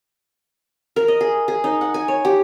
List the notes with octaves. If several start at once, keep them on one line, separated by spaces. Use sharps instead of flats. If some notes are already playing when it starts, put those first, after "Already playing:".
A#4
D#5
G#4
G#4
D#4
F#5
G#5
C#5
G4